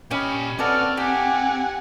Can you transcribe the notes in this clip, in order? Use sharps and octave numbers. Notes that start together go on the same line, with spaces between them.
A#2 C#4 G4 D#5 B5
B3 C4 F#4 A4 D5 F6
G4 F#5 G#5